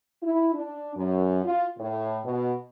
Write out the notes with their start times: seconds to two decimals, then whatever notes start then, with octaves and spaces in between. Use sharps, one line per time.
0.23 E4
0.54 D4
0.96 F#2
1.45 F4
1.79 A2
2.25 B2